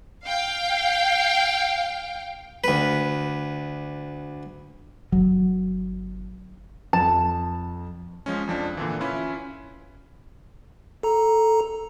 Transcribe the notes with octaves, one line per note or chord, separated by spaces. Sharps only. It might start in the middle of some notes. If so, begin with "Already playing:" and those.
F5 G5
D2 B4
G1 F#3
F2 A5
F3 G#3 C#4
F2 F3 D4
A#2 D3 E3
C#4 E4 F4 B4
A4 A#5